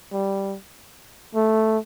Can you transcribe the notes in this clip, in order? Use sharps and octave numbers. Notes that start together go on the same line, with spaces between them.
G3
A3